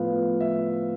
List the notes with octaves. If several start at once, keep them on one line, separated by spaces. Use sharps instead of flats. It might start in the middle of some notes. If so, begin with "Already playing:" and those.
Already playing: A2 F3 B3 F5
E5